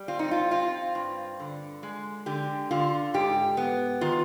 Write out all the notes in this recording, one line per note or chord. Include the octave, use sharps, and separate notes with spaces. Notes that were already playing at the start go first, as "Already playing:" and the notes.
Already playing: G3
C4 F4
D#4
F4
C4 F4
G2
D3
G#3
D3 G4
D3 F4
G#2 G4
B3
D#3 F4